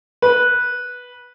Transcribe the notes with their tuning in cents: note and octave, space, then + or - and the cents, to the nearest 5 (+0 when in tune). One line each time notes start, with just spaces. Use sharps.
B4 -10